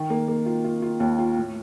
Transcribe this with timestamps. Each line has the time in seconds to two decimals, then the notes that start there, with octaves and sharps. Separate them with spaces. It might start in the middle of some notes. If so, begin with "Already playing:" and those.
Already playing: D#3
0.10 A#3
0.28 A#3
0.46 F4
0.64 F4
0.82 F4
1.00 D#2
1.18 F4
1.37 A2